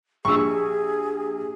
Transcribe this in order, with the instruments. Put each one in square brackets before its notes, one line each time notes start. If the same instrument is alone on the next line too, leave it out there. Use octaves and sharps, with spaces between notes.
[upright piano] A#1 [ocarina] G4 [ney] G#4 [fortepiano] C#6 E6